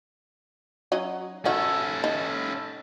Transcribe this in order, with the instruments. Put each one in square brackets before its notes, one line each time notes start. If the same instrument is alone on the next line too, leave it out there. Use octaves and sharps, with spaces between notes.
[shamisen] F#3 C#4 D#4
[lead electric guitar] C#4 A4 [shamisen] D#4 F#4
[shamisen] D#4